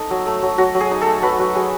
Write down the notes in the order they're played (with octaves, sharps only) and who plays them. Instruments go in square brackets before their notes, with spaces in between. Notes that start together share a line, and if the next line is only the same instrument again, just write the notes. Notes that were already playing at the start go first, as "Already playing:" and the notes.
Already playing: [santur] D#4 A4 C#5 D#5
F#3
A3
F#3
F#3 F#4
F#3
G#4
D#4
A3 A4
F#3 B4
F#3 F#4
F#3 G#4